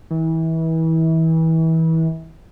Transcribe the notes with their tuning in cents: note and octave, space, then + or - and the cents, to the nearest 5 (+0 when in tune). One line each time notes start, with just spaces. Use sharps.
E3 -30